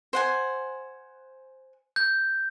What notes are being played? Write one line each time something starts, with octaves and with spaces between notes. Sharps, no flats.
C5 F#5 G#5
G6